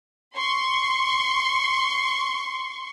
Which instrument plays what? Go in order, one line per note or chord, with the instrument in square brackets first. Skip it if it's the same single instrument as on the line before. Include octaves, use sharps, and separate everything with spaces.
[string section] C6 C#6